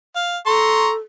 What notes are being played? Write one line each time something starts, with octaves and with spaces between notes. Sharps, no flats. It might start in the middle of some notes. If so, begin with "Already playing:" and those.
F5
A4 A#5 C6 C#6